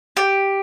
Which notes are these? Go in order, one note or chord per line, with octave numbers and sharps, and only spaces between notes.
G4